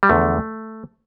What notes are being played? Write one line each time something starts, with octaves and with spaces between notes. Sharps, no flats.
G3
E2 D3 F3 A3